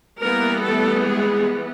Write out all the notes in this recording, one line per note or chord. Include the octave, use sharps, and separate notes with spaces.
E3 G3 A#3 B3 A#4
A3 A4
G#3 G#4